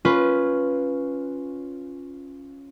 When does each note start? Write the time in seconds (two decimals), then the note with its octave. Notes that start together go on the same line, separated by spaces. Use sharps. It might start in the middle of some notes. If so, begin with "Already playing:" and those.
0.05 C#4 F4 B4